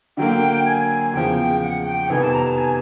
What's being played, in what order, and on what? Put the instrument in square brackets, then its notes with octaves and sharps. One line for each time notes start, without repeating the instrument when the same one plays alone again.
[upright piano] D3 F#3 A#3 [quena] G5
[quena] G#5
[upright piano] E2 C#3 F3 [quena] G5
[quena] F#5
G5
G5
[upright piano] F2 C3 D#3 G3 B3 [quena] G#5
[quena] A5
A#5
A5
G#5